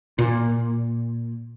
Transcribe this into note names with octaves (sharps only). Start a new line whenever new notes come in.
A#2